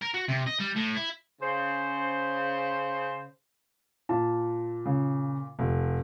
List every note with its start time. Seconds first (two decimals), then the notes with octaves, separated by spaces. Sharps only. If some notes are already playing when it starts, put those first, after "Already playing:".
0.02 A#4
0.14 F#4
0.28 C3
0.46 D#5
0.60 G3
0.76 A2
0.95 E4
1.41 C#3 C5
4.09 A#2 A5
4.86 C#3
5.59 F1